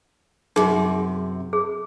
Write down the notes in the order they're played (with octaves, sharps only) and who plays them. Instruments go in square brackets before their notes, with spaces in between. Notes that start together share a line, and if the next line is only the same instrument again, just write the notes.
[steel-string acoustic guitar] F#2 C3 [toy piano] D#4 G4 G#4
[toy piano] G#4